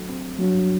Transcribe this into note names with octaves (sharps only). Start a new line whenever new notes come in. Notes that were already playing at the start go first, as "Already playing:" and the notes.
Already playing: D3 F#3 A3
C4
G2 F#3